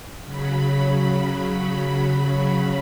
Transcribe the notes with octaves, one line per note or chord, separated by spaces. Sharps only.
C#3 F#3 B5